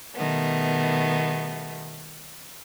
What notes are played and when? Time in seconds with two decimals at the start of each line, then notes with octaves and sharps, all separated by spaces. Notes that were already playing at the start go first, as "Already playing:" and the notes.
0.15 B2 D#3 G3 A3 B3